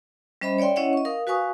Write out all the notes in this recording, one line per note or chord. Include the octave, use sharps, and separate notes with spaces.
G3 C#4 C5 D#5 E5 B5
C#5 D5 E5 G5 C6
C#4 E4 C#5 D#5 E5 F#5
D#5 C#6
A#4 F5 D#6
F#4 B4 F5 G#5 C#6 D#6